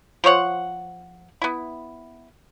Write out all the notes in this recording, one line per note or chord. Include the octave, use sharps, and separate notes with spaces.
F3 C5 C#5 F#5
B3 E4